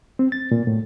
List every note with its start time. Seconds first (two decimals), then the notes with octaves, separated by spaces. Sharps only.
0.19 C4
0.32 A6
0.51 A#2
0.67 A2